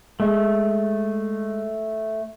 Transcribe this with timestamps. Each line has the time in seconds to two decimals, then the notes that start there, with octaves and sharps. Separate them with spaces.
0.20 G#3 A3